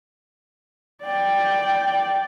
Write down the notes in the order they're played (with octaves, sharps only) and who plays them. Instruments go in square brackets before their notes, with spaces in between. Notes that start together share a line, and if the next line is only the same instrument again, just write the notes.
[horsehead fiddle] D5 G5